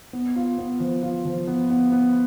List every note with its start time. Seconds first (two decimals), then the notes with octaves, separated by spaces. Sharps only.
0.13 B3
0.36 F4
0.58 B3
0.80 F3
1.03 F4
1.25 F3
1.47 B3
1.70 B3
1.92 B3